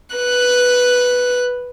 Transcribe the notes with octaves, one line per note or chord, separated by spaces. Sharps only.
B4 F#6